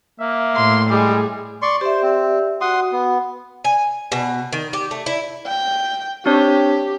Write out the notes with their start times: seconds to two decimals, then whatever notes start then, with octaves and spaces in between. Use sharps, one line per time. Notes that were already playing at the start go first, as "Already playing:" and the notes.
0.20 A#3 E5
0.56 A2 C6
0.90 G3 G#3 G#4
1.62 D5 C6 C#6
1.81 G4 C5 D5 E5
2.03 C4
2.61 F#4 F#5 C6 D#6
2.92 B3
3.64 G#5
4.12 B2
4.52 D#3
4.73 G4
4.91 A3
5.06 E4
5.46 G5
6.26 C4 D4 G4 C#5